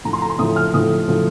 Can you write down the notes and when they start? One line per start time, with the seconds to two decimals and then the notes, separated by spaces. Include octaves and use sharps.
0.05 A2 F3 A#5
0.13 C6
0.22 A#5
0.30 C6
0.39 A2 F3 D#6
0.56 F6
0.74 A2 F3 D#6
1.08 A2 F3